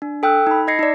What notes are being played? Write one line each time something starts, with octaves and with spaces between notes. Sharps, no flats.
D4
A4 G5 E6 F#6
D#4 B5
D#4 D#5 G#6 A#6 C7 C#7
D#4 D5